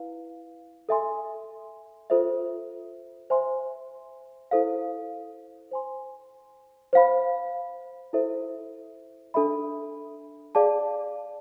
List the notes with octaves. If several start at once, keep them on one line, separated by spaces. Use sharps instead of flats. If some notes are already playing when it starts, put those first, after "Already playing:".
Already playing: E4 B4 F5
A4 E5 G#5 C6
F4 A4 C5 E5
C5 E5 G#5 C6
E4 A4 C5 F5
C5 G#5 C6
C5 F5 B5
E4 A4 C5 E5
D4 A4 E5 B5
G#4 D5 F5 A5 D6